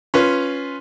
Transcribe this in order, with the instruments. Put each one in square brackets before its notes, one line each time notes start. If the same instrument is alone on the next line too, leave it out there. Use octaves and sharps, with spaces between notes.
[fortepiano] C#4 F4 B4